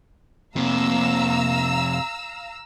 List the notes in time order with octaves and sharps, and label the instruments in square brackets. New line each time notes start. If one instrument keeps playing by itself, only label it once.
[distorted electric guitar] F2 C3 [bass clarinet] A#3 [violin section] F5 A#5 E6